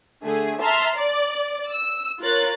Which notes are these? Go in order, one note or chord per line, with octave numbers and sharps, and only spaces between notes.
D3 A3 G#4
E5 A5 A#5 C6 F6
D5
E6
F4 A#4 C#5 F#6 A6